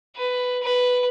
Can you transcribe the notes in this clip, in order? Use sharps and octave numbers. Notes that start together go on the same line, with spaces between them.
B4
B4